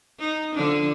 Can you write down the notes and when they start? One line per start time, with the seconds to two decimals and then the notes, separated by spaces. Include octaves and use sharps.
0.19 D#4
0.55 D3 F3 D4